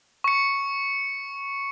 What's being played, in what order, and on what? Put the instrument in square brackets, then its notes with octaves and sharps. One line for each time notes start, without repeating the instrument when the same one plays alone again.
[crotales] C#6 C#7